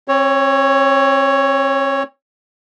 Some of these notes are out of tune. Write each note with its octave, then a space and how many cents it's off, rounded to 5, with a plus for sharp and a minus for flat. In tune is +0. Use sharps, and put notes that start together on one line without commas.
C4 +40 C#5 +0